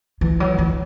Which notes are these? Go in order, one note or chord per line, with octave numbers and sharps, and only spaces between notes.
E3
F#3
E3